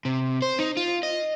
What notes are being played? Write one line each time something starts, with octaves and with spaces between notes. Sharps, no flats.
C3
C5
D#4
F4
D#5